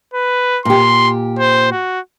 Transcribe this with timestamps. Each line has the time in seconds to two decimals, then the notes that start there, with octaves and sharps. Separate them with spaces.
0.14 B4
0.65 A#2 G4 C6
1.39 C5
1.71 F#4